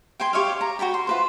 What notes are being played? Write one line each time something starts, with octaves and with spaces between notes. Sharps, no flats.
G5 G#5 C6
G4 C#5 D#5 F5
A#5
F#4 A#4 G5 B5
C6
F4 B4 C5